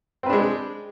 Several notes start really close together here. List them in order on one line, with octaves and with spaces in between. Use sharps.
C4 B4 D4 G#3